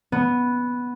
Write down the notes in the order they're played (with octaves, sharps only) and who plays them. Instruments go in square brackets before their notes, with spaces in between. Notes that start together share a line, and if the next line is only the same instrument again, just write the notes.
[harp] B3